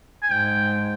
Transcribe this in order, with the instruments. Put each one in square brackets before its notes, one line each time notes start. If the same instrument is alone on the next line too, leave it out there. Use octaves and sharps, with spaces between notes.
[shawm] G#5
[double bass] G#2 [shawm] G5